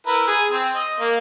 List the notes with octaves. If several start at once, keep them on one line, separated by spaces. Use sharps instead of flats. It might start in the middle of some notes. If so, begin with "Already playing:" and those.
E4 A#4 B4
G#4
C4
D#5
A#3